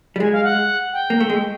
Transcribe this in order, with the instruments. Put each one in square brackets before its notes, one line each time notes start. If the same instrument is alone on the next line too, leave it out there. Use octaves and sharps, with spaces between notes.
[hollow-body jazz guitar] G3
[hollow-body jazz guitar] G#3 [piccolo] G#5
[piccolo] F5
F#5
G5
[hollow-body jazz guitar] A#3
A3
G#3